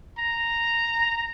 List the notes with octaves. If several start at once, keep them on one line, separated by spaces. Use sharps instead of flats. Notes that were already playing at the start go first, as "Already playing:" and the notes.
A#5